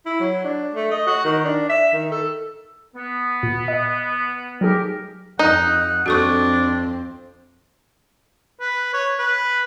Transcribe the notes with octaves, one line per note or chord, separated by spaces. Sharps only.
E4
F#3
D4
A3
D#5
F#4
D#3
D4
E5
D#3
A4
B3
A#2
D#5
F#3 D#4 G4 G#4 A#4
F2 D#4 F#5
F2 C4 D4 F#4 A4 C#6
B4
C#5
B4